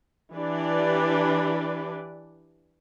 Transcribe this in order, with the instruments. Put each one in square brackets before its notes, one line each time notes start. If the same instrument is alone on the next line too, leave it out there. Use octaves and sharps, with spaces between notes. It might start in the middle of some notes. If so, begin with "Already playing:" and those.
[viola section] E3 D4 G4 B4 D5